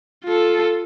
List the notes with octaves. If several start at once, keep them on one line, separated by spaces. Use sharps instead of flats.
F4 A4